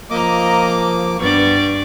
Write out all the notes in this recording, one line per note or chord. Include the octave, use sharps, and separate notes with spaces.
F3 A#3 D#5 A#5 D6
G2 B3 D5 C#6